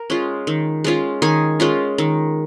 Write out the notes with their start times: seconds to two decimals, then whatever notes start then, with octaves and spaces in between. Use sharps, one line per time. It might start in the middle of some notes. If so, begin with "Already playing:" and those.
Already playing: A#4
0.10 G#3 C#4 F4
0.47 D#3
0.84 G#3 C#4 F4
1.22 D#3 G#4 G#5
1.60 G#3 C#4 F4
1.98 D#3